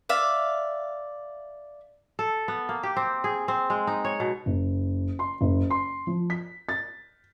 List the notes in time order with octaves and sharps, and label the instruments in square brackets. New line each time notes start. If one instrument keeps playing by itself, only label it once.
[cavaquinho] D5 E5 F5
[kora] A4
B3
A#3
G4
C4
G#4
C4
G#3
D#4
C#5
B2
[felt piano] F#1
C6
F#1
C6
F3
B6
A6